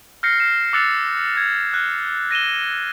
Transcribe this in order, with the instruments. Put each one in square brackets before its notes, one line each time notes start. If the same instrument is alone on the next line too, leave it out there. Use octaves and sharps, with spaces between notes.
[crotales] F6 G6 A#6 C7 C#7
F6 C7 E7
D6 E6 F#6 A6 C#7 F7
G#6
F6 F#6
A#6 D#7 E7 G7